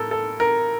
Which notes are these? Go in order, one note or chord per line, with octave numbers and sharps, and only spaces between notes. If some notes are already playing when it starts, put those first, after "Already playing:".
Already playing: A2 A4 A#4
A4
A#4